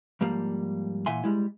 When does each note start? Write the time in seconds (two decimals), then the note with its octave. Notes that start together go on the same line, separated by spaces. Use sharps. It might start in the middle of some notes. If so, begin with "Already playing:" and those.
0.21 G#2 F3 G3 A#3
1.06 A#2 E3 E5 F#5 G#5 C6
1.24 G3 G#3 E4